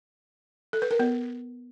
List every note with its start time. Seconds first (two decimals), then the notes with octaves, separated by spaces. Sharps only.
0.73 A4
0.82 B4
0.91 A#4
0.99 B3